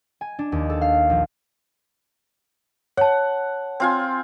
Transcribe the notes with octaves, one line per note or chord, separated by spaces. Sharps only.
G#5
D4
D#2
A4
F5
A#1
C#5 F#5 A5
C4 F4 G#5